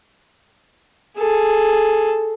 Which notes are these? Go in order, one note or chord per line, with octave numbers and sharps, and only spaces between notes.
G#4 A4